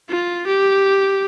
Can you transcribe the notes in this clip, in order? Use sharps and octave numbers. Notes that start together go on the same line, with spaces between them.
F4
G4